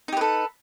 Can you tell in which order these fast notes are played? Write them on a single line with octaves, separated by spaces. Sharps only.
D#4 G4 B4 A4